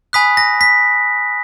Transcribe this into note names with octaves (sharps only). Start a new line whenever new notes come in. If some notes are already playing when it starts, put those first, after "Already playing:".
G#5 B5 D#6 F#6 B6
A#6
B6